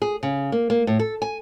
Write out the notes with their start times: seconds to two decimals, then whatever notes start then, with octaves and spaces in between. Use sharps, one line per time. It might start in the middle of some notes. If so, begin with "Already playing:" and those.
0.02 G#4
0.23 C#3
0.52 A#3
0.70 A#3
0.87 A2
0.99 A4
1.22 G#5